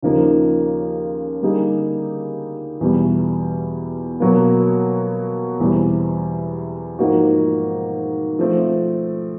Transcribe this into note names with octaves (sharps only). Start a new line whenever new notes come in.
D#2 C#3 F3 A#3 D#4
D3 G3 A#3 D#4 G#4
E2 B2 G3
B2 F#3 A#3
E2 B2 G3 C4 E4
G#2 F3 A#3 D#4 F#4
F3 A3 C4